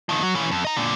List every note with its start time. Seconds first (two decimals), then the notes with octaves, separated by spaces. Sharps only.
0.09 D#3 F3
0.23 F#3
0.35 E3 C#4
0.51 F2
0.65 D#5 A#5
0.77 A#2 D3